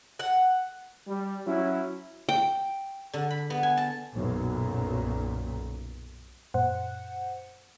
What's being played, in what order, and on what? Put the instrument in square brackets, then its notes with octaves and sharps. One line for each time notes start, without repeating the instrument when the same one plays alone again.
[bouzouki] F#5
[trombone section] G3
F#3 C#4 E4
[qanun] G5
[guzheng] D3
B5
B3
G#5
A5
[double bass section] B1 F#2 A#2
[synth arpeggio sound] F#2 A#2 [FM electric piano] C5 F#5